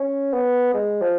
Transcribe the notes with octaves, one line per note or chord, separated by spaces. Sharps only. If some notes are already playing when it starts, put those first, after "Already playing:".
Already playing: C#4
B3
G#3
F3